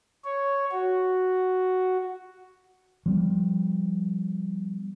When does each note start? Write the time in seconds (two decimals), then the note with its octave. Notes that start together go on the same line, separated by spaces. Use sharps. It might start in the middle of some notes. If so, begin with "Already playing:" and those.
0.24 C#5
0.71 F#4
3.06 F3 G3 B3